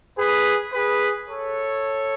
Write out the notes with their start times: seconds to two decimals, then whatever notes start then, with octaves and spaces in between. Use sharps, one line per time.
0.18 G#4 B4
0.72 G#4 B4
1.27 A4 C#5